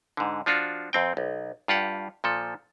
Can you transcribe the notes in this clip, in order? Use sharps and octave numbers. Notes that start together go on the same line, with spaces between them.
G#2 D3
F3 D4 F4 F#4
F2 C4 G5
B1
G2 F4 G4 F#5
A#2 F3 A4